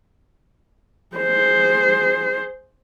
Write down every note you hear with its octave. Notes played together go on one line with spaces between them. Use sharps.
G#4 C5